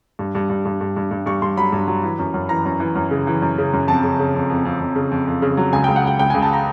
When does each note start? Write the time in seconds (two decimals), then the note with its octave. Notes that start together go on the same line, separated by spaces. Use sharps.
0.19 G2
0.35 G2
0.50 G2
0.65 G2
0.81 G2
0.96 G2
1.11 G2
1.26 G2 C#6
1.42 G2 C6
1.57 F#3 B5
1.72 G2
1.88 F#3
2.03 E3
2.19 F#2
2.34 F#2
2.49 E3 A#5
2.65 F#2
2.80 E3
2.95 F#2
3.11 C#3
3.27 E3
3.42 F#2
3.58 C#3
3.73 F#2
3.88 F2 A5
4.03 C#3
4.19 C#3
4.35 F2
4.50 F2
4.65 F2
4.80 F2
4.95 C#3
5.11 F2
5.27 F2
5.42 C#3
5.57 F#3
5.73 C#2 G#5
5.84 C#2 G5
5.96 F#5
6.04 C#2 G5
6.19 C#2 G5
6.30 C#2 G#5
6.42 A5
6.53 A#5